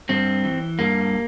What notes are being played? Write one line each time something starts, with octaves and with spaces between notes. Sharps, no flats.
G2 C4
E3
G2 A#3